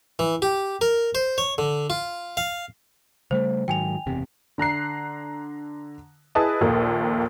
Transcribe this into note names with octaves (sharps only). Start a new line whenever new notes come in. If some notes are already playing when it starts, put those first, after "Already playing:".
E3
G4
A#4
C5
C#5
D3
F4
F5
C#3 G3 A3 C5
G#2 D#3 F#3 G5 G#5 F7
F#1 E2 C3
D3 A#5 F#6 C7
E4 G#4 B4 D#5 A5 D#6
A#1 D#2 A#2 A#3 A4